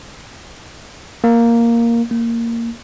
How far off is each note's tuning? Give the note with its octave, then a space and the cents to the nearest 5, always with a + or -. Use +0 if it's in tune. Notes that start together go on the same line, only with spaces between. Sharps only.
A#3 +0
A#3 -10